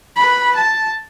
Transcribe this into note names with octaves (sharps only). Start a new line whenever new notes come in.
B4 B5
A5